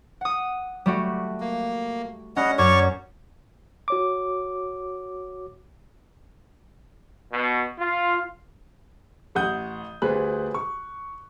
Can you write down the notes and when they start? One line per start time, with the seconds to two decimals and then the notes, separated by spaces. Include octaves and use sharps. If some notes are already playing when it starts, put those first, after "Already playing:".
0.21 F#5 D#6
0.86 G3 A3 F#4
1.40 A#3
2.36 G3 C#4 D#5 F#5
2.58 F#2 C#5 D5 C#6
3.88 F#4 C#5 D6
7.33 B2
7.79 F4
9.35 A1 F#5 D#6 G6
10.02 D2 G3 G#4 B4 C5 F#6
10.54 C#6